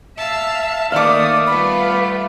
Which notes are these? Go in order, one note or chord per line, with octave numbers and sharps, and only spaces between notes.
E5 F5 A5 E6
D#3 A3 A#3 D5 F5 D6 D#6
G3 B3 F4 B5